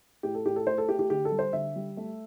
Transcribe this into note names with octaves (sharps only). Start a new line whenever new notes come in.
A2 G4
A4
A2 G4
A4
A2 C5
A4
A3 G4
G4
D3 G4
A4
G3
C5
D3 E5
G3
A3